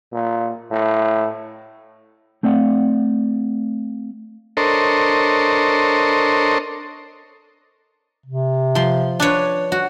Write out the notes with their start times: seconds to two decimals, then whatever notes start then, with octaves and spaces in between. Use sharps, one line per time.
0.12 A#2
0.71 A2
2.43 A3 C4 D5 F5 F#5
4.57 D4 A4 A#4 C5 C#5 D#5
8.26 C3
8.75 F3 C6
9.20 D4 B4 C#5
9.72 F#4